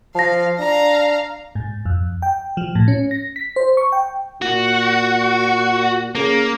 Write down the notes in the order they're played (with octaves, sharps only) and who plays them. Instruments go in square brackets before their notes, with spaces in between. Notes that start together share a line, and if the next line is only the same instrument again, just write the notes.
[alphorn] F3 [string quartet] F5 [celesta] A5 A#6
[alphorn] D4 [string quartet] F5 A#5
[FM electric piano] G#2
F2
G5
F3
A2
C#4
A#6
B6
C5
C#6
G5
[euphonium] A#2 [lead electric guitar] F#4
[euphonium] C#3 [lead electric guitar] A#3